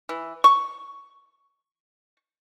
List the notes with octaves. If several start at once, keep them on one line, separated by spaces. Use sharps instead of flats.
E3
C#6